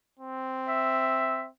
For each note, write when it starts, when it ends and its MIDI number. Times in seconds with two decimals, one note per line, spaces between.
0.19 1.49 60
0.68 1.44 76